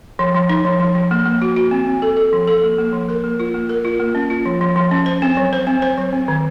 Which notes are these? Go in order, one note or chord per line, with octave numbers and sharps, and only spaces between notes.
F3
F3
D#4
F3
F3
F3
A#3
A#3
F#4
F#4
C4
C4
A4
A4
F3
A4
A#3
A#3
F3
A#4
A#3
F4
A#3
A#4
F4
A#3
C#4
F4
F3
F3
F3
C#4
C5
C4
F#3
C5
C4
C5
F#3
C4
D#3